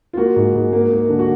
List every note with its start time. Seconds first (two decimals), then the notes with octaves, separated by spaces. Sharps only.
0.13 F4
0.17 A#3 F#4
0.36 G#2
0.55 G#2
0.73 A#3
0.91 A#3
1.09 D3
1.19 F#4